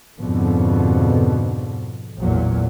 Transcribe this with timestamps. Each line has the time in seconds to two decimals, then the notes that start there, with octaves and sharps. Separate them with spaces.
0.18 F2 G#2 B2 D3
2.19 A1 E2 A#2 F#3